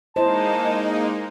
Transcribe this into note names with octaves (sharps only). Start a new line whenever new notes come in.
G#3 A#3 D#4 E4 C5 D#5 A5